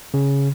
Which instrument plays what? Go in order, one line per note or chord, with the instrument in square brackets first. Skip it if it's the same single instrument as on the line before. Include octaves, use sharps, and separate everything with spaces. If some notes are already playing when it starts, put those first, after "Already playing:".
[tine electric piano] C#3